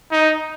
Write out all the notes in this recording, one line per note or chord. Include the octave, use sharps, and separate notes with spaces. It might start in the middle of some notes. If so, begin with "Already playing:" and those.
D#4